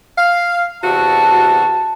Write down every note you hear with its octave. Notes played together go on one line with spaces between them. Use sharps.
F5
E2 C3 F#4 A5